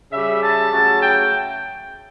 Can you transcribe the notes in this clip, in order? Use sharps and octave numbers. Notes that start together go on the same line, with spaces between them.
C#3 G3 E5
A5
C#3 F#3 A3
G5